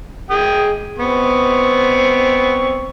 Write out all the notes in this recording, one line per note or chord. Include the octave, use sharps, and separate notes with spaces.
G#3 G5 D#6
B3 C4 C#6